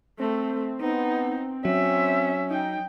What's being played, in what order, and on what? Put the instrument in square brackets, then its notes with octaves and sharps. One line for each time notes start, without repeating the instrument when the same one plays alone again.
[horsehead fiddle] A3 [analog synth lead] C4
[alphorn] B3 [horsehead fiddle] D#4
[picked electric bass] F#3 [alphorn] C#4 [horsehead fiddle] E5
[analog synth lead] D#4 [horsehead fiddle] G5